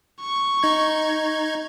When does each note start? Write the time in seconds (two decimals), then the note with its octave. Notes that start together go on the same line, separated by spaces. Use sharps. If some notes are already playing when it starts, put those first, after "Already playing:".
0.21 C#6
0.63 D#4 G#6